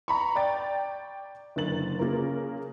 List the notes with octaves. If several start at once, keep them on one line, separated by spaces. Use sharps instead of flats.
A#5 B5 C#6
D5 G5 A6
F#1 D3 A#4 A6 F#7
C#3 A#3 F4 A#4